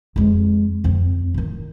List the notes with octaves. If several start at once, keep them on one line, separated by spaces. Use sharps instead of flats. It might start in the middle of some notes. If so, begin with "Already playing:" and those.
F2 G#3
F2 C4
A2 D#3